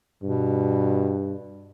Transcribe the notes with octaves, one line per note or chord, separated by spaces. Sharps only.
G2 B2